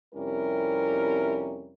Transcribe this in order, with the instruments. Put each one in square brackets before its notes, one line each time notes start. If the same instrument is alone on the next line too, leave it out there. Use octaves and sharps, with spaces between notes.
[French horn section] F2 C3 G3 C#4 E4 A#4